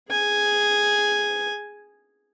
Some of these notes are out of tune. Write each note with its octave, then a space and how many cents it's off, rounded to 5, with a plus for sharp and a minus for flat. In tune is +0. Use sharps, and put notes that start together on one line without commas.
G#4 -5 G#5 +0